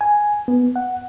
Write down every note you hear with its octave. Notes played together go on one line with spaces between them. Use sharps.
G#5
B3
F#5